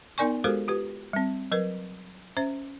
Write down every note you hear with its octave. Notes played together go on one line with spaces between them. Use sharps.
B3 D#4 A#4 D5 G#5 C#6
G#3 F#4 G4 A4 A#4 C5
F4 G4 B4
G3 C4
F#3 A#4 B4
C#4 C5 E5